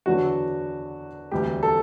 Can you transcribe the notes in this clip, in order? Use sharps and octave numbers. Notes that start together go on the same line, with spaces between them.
F#1 E2 D3 F#3 F#4
E1 D2 C3 G3 G4
A4